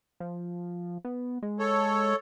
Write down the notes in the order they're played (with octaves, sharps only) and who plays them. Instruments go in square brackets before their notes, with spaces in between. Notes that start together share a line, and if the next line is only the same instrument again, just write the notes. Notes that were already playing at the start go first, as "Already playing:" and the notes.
[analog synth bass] F3
B3
G#3
[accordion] A4 C#5